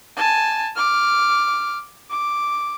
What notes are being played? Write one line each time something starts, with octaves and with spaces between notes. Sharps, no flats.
G#5 A5
D6 F6
D6